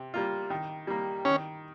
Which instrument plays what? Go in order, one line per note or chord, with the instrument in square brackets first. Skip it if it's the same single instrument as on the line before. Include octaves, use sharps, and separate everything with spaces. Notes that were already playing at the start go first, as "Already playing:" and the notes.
Already playing: [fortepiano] C3
G3 A#3 F4
D#3
G3 A#3
[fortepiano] D#3 [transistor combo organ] C#4